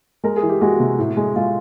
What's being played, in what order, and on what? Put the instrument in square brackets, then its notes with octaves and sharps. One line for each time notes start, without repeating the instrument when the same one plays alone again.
[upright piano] G#3 A#4
G#4
E3
G4
G#3 F#4
C3
A2
G#3
G#3 F4